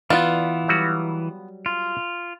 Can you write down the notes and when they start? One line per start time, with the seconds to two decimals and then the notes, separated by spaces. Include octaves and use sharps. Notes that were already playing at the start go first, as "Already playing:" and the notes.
0.10 E3 B3 F4 D5
0.68 F#3 G3 F#4
1.66 F4